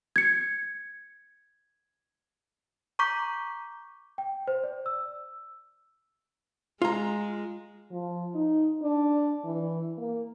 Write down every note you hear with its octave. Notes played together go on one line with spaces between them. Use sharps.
G#6 C#7
A#5 C#6 D6 G6 B6
G5
C5
D5
E6
G#3 F4 A#5
F3
D#4
D4
E3
A#3